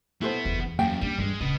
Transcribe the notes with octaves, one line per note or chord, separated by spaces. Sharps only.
B3 E4 F#4 A4 C5
F#1 E2
F#2 A#3 G5
G3 D4
G2 G3 G#3
D1 A#1 C#3 B4 D#5